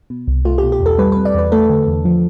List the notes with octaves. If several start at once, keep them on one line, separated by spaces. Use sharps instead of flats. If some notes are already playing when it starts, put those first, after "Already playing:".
B2
C2
A3 F4
G4
B2
G4
E2
A4
G3 B4
C3 B4
D5
E2 B4
A3 A4
D3
E2
F3